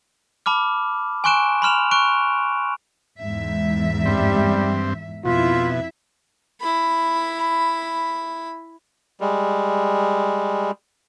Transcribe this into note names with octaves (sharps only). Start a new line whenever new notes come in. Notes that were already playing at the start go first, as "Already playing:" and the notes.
A5 B5 D6 F6
G#5 C6 C#6 F#6 D7 E7
B5 C6 F6 E7 F7
C#6 F#6 D7
E2 G#2 E5
G2 G3 C4
F2 B2 E4 F4 E5
E4 B5
G3 G#3